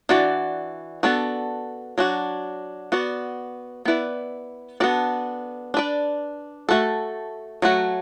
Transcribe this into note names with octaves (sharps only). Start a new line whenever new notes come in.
E3 D4 F#4 D5
B3 D4 F#4 A4
F#3 D4 F#4
B3 F#4 D5
B3 E4 B4 D5
B3 D4 F#4 A4 D5
D4 B4 D5
A3 F#4 A4
F#3 A3 F#4